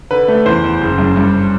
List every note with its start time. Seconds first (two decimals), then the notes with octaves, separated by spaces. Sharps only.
0.11 D3 B4
0.28 A3
0.46 E2 C5
0.64 E2
0.81 F#1
0.98 F#2
1.16 G2